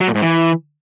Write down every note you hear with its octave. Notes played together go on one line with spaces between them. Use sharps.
F#3
A#2
G#2
E3